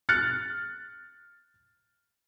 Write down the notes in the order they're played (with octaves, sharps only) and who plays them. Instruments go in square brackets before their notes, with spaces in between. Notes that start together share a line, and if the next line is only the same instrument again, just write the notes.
[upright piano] F6 F#6 A6 C#7